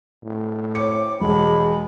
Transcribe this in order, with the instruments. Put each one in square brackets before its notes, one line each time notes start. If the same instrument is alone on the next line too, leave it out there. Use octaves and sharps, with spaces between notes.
[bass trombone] A2
[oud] C4 C#4 [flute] D6 [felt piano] C#7
[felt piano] E1 [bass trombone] G#3 [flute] B5